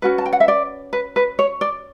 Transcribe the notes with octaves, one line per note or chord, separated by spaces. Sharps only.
C#4 F#4 B4
A5
G5
F#5
E5
D5
B4
B4
C#5
D5